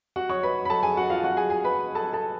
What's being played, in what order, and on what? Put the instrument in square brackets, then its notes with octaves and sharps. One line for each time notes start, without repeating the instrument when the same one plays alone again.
[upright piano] F#4 F#5
C#5 C#6
B4 B5
B5
A4 A5
G#4 G#5
F#4 F#5
F4 F5
F#4 F#5
G#4 G#5
G#4 G#5
B4 B5
A4 A5
A4 A5